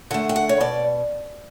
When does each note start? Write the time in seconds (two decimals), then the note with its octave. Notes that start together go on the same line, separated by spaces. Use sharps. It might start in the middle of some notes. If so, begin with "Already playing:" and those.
0.11 D3 A3 F#5
0.29 G5
0.36 F#5
0.49 C#5
0.61 B2 D5